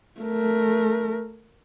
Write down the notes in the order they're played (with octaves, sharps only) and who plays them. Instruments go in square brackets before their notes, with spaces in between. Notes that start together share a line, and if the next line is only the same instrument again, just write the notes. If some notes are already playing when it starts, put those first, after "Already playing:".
[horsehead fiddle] A3 A#4